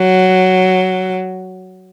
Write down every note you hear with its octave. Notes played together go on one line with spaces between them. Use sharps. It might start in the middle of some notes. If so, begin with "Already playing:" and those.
Already playing: F#3